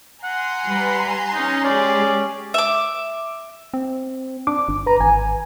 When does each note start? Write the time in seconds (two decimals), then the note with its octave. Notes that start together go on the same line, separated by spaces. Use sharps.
0.24 F#5 G#5 A#5 C6
0.68 G3 B4
1.34 C#4 D#4
1.64 G#3 C#4 G4 G#4 D5
2.54 E5 D6
3.74 C4
4.47 D4 D6
4.68 G1
4.86 B4 A#5
5.01 G#1 G#5